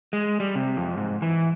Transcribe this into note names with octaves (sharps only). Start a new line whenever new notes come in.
G#3
G3
C3
F2
G#2
E3